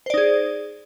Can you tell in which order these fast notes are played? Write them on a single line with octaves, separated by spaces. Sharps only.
C5 D5 D#4 G#4